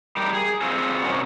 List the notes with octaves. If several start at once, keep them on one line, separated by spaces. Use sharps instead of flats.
G3 G4 A#4
G#4
C4 F4 F#4 G#4
C3 D#3 F#3 C#4 F#4 A#4